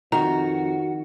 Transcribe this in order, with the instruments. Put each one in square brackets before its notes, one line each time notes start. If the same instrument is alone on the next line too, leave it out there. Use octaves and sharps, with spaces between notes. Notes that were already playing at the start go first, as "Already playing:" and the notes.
[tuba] F2 [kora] D#3 [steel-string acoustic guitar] F#4 [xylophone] A#5